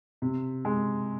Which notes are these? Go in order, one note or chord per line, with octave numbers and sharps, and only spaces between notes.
C3
G#3